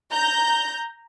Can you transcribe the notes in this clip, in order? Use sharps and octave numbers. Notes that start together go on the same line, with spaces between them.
A#5 G6